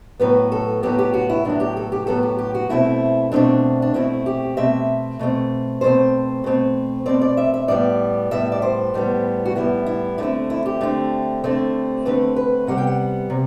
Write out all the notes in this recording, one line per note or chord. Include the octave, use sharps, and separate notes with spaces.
A2 F#3 B3 B4
A4
A2 F#3 B3 G4
G4
F#4
E4
A2 F#3 B3 D4
G4
A4
G4
A2 F#3 B3 A4
G4
G4
F#4
B2 A3 C4 E4
B2 A3 C4 D4
D4
B2 A3 C4 E4
G4
B2 A3 C4 E5
B2 A3 C4
B2 A3 C4 C5
B2 A3 C4
B2 A3 C4 D5
D5
E5
E5
A2 G3 B3 D5
A2 G3 B3 E5
D5
C5
A2 G3 B3
F#4
A2 G3 B3 E4
E4
D3 A3 C4 E4
E4
G4
D3 A3 C4
D3 A3 C4
D3 A3 C4 B4
B4
C3 G3 B3 F#5
G5
F#5
C3